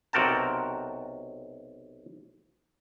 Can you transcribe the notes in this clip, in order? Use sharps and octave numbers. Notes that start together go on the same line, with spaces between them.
B1 C3 F#4 A#4 G5 A5